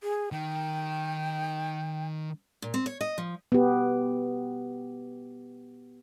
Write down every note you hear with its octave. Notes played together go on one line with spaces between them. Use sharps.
G#4
D#3 G5
A#2
C4
C#5
D#5
F3
B3 G4